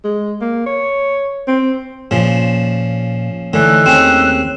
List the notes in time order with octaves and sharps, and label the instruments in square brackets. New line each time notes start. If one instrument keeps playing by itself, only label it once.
[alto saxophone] G#3
A#3
C#5
C4
[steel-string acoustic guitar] A#2 [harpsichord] C#3 F3
[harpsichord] D3 E3 [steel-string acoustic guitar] A3 C#5 [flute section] D#4 E6 F#6
[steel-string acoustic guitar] D#2 G#4 [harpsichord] C4 C#4